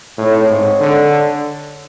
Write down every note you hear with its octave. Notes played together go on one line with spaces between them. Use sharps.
A2 C4 D#4 G#4 C#5
G#2
D3